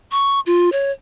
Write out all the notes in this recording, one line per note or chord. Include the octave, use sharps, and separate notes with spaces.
C#6
F4
C#5